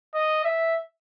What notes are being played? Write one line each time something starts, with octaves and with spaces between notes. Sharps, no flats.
D#5
E5